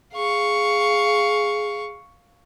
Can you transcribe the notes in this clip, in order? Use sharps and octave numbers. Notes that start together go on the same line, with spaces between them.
G#4 F5 C#6